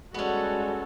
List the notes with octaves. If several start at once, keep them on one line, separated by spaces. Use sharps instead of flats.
G3 G#3 B3 C#4 F#4 A4